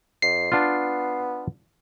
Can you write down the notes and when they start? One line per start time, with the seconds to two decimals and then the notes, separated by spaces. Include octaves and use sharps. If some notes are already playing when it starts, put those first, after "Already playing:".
0.22 F2 C7
0.52 B3 D4 F4